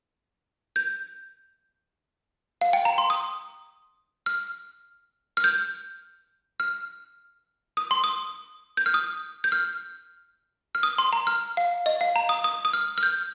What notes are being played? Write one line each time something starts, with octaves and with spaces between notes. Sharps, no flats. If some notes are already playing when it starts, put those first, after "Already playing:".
G6
F5
G5
A#5
C6
D#6
F6
F6
G6
F6
D#6
C6
D#6
G6
F6
D#6
G6
F6
F6
D#6
C6
A#5
F6
F5
D#5
F5
A#5
D#6
D#6
D#6
F6
F6
G6